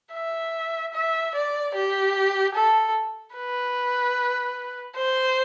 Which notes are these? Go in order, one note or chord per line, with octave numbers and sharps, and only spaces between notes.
E5
E5
D5
G4
A4
B4
C5